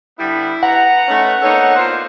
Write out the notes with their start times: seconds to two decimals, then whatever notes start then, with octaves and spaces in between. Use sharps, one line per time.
0.19 D3 G3 B3 E4
0.63 B4 F#5 A#5
1.08 A3 C#4 D#4
1.42 A#3 B3 D4 D#4 A4 C#5
1.77 F4 C5